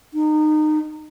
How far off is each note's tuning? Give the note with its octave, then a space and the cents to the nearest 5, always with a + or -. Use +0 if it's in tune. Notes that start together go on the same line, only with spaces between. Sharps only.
D#4 -25